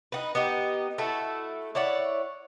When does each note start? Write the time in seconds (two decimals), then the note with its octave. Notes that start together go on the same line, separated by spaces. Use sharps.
0.12 D#4 F#4 B4
0.35 B3 D#4 G4
0.98 A3 E4 F#4 A4
1.75 E4 C#5 D5 F#5